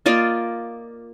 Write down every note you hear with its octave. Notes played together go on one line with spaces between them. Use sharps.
A#3 F4 D5 D#5